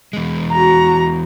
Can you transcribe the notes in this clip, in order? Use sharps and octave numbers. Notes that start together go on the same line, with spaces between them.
E2 G#3
F#4 A#5